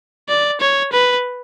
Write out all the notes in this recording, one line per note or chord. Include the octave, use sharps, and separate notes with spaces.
D5
C#5
B4